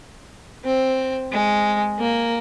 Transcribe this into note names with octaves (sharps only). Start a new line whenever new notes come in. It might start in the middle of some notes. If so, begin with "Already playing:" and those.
C4
G#3
A#3